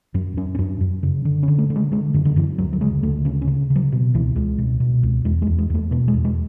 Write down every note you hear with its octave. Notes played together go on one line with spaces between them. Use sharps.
F#2 F#3
F#2 C#4
C#4
F#2 D4
F#2
C#3
D3
C#4
D3
A3
D3
G#3
D3 G#3
F#2 D3
D3
F#2 E3
D2 F#3
F#3
C#3 G#3
D2 A3
C#3 C#4
C#4
C#3
C#3
F#3
B2
C#2 E3
C#2 G#3
B2
B2
C#2
E2 G#3
G#3
E2
G#3
E2 A3
B2 B3
G#3
E2
G#3